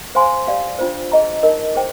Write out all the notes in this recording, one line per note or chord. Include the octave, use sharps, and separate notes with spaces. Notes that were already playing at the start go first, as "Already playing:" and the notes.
C5 F5 G#5 C6
G4 D5 F5
D4 F4 C5
G#4 D#5 A#5
D#4 A#4 D#5
G#4 C5 G5